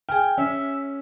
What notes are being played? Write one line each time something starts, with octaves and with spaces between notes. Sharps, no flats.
G#4 G5 G#5 F6
C#4 E5